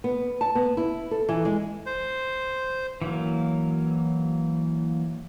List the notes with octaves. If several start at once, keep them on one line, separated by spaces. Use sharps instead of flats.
B3
A5
B3
E4
A4
E3
G#3
C5
E3 F#3 A#3